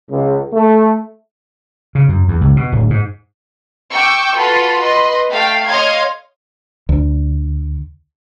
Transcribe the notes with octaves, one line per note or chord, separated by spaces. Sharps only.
C#2
A3
C#3
F#2
E2
C#2
B2
D1
G#2
G5 C#6 D6 E6 G6
F4 F#4 A4 B4 C6
B4 D#5 C6
A3 F5 G5 B6
C#5 D#5 F5 C6 F6 G#6
D2